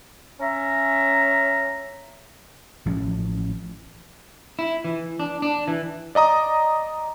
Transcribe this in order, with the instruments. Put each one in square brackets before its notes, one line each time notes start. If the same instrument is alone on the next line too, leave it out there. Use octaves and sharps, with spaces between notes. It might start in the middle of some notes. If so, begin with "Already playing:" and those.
[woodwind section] C#4 E5 A#5
[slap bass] A1 F3 G3 C#4
[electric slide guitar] E4
E3
D4
D4
E3
[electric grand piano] D5 D#5 A#5 D#6